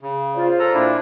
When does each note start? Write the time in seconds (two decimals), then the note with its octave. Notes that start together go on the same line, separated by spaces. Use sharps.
0.01 C#3
0.34 F4 C5 D5
0.59 A4 A#5
0.74 A#2 D4 E4